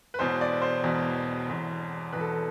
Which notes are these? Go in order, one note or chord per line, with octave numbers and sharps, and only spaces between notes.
B4
E1 E2 B2 C5
D5
C5
E1 E2 B2
E1 E2 B2
E1 E2 B2 B4
A4